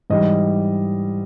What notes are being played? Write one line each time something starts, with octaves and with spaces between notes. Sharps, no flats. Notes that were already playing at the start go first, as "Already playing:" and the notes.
G#2 E3 G3 D#5